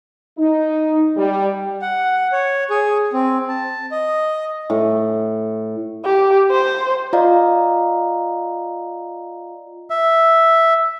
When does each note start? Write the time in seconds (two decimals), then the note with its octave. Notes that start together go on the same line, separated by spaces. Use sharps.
0.38 D#4
1.17 G3
1.82 F#5
2.32 C#5
2.70 G#4
3.13 C4
3.49 A5
3.92 D#5
4.70 A2
6.05 G4
6.51 C5
7.13 F4 D5 D#5 F5 A#5
9.90 E5